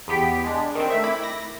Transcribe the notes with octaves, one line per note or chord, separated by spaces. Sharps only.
E2 B3 G4 B6 D7
G#3 D4
D#3 C4
A3 E5
E4 B5 D6
A#6